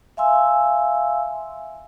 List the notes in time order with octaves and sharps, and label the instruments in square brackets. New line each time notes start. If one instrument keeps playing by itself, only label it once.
[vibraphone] E5 F5 G#5 C6 E6